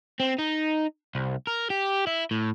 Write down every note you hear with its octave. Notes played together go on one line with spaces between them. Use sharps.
C4
D#4
C2
A#4
G4
E4
A2